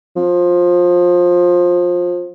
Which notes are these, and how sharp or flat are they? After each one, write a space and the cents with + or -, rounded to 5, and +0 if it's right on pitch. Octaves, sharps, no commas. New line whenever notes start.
F3 +20